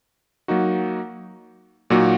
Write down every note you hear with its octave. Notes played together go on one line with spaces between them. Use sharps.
F#3 A#3 D#4 F#4
A#2 F#3 A#3 D#4 F#4